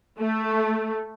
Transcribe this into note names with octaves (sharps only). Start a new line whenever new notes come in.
A3